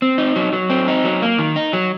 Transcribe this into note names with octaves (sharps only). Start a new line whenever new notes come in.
C4
D#4
F#3
F#3
C4
D#4
F#3
A#3
D#3
D#4
F#3